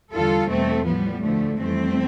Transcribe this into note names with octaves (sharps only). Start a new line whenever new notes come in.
E2 D3 G3 F4 A4
E2 B2 G3 A3 C4
A2 F3 G3 B3
D2 D3 F3 A3
F2 E3 G3 A3 C4